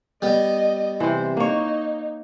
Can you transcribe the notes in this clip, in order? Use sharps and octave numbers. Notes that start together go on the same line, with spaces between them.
G3 B3 D#5
C3 E3 C5
A#3 D#4 C#5